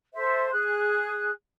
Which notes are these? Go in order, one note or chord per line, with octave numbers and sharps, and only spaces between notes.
A4 C5 E5
G#4 F#6